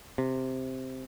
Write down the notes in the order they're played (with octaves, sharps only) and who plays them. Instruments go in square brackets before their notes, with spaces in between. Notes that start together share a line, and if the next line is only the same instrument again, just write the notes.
[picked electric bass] C3